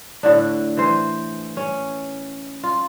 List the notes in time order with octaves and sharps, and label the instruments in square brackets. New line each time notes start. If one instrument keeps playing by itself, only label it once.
[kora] A2 D3 D4
E3 C5
C#4
F4